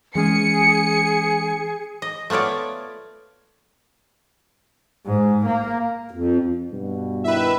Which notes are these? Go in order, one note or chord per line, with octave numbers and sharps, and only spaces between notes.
E3 G#3 C#4 G#4 C#7
D#5
A3 B3 F4 C#5 D5
G#2
A#3
F2
G2 B2
D#3 E4 B4 E5